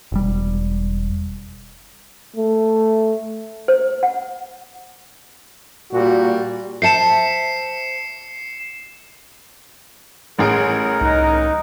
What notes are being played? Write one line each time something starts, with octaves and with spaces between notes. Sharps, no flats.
E1 G3
A3
C5
F#5
A#2 G3 F#4
C5 E5 A5 C7 C#7 E7
A1 G#4 A#4 D7
C2 D#4 F#6